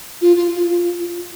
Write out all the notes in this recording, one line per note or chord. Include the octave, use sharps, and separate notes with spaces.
F4
F4
F4